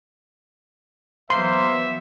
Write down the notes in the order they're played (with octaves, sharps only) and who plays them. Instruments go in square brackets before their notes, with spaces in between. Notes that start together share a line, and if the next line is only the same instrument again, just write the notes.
[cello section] E3 F#3 B3 [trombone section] A#3 C5 [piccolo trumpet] E5 [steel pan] C6